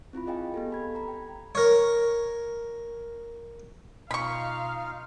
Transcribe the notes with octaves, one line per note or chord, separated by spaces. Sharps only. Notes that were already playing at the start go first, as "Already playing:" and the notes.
C4 E4 F4 B5
G#4 D#5 F5 G5 G#5
B3 G4 A4
A4 B5 G#6
A#5 B5
G5
A#4 C#5
B2 D#4 F4 F5 B5 C#6